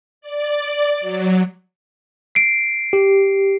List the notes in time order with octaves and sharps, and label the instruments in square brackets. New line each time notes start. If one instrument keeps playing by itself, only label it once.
[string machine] D5
F#3
[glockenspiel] C7 D7
[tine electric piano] G4